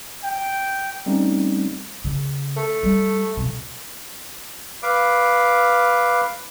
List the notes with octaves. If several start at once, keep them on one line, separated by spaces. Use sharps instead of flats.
G5
G3 A3 C4 C#4 D#4
C#3
A3
G3
B2 F3
B4 F5 D6